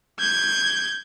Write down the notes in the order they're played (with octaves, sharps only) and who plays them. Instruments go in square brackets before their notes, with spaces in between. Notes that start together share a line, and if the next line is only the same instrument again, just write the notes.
[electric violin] G6 G#6